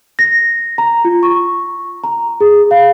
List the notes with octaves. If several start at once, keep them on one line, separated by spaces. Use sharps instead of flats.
A#6
A#5
F4
C#6
A#5
G#4
F5